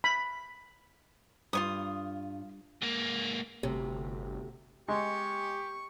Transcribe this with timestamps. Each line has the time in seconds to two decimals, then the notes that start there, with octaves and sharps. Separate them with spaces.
0.04 B5
1.53 G2 F4 C#5 D#6
2.82 G#2 A#3
3.63 G1 D2 C3
4.88 G#3 G4 C#6